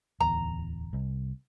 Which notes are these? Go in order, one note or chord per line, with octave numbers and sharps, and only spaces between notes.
D1 E2 A#5
C2